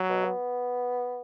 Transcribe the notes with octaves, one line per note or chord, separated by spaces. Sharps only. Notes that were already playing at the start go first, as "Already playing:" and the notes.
Already playing: F#3
B2
B3